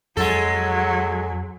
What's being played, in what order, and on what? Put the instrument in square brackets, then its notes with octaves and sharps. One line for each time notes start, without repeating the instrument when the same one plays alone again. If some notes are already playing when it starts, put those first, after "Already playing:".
[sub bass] F2 [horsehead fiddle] F#3 [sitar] G#3 A4